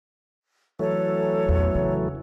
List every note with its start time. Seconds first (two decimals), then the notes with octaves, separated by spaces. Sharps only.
0.79 E3 F#3 A3 A4 C#5
1.49 E2 A#2
1.75 C#3